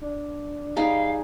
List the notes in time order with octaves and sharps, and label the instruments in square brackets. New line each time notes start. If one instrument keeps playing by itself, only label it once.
[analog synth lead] D4
[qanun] G3 D#4 [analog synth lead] G#4 [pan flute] F5